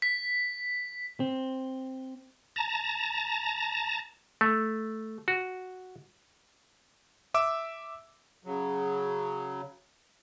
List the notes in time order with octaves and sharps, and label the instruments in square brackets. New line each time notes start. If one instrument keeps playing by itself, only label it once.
[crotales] B6
[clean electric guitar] C4
[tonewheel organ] A5 A#5
[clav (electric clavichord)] A3
F#4
[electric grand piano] E5 D6 E6
[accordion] C#3 F#3